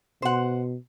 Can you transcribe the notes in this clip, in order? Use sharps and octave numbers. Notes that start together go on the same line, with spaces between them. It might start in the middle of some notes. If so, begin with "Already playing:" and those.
B2 C5 F#5